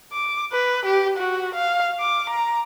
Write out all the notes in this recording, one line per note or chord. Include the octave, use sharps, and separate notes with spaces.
D6
B4
G4
F#4
F5
D6
A#5